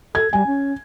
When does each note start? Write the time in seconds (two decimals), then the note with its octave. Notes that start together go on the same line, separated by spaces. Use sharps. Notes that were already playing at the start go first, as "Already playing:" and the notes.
0.15 A4 G#6
0.33 G3 G#5
0.47 C#4